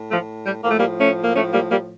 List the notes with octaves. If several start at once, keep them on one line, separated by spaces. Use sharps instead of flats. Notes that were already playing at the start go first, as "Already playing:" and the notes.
Already playing: A2
F3 A3
G3
A2 F3 A#3
A3
G3 A#3
A3 C#4
A#3
A3 C#4
G3 A#3
G3 A#3